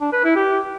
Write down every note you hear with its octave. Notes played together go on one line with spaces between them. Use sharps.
D4
B4
E4
G4